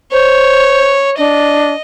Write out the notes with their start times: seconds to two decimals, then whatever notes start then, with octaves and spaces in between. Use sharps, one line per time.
0.12 C5 C#5
1.18 D4 D#5